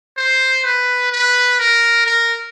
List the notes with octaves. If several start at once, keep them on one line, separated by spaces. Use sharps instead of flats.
C5
B4
B4
A#4
A#4